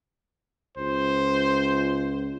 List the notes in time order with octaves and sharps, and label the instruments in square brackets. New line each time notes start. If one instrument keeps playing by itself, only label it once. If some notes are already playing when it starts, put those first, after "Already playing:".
[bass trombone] C#2 [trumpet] C5